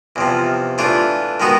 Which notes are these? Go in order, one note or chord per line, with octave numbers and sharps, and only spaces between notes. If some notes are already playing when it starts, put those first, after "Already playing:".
E2 C3 F3
E3 A3 D4 F4
D#3 G#3 B3 D#4 F#4